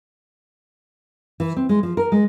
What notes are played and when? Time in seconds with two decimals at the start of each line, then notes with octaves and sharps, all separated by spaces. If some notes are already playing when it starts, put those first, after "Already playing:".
1.40 E3
1.56 C4
1.69 G#3
1.83 F3
1.97 A#4
2.12 G#3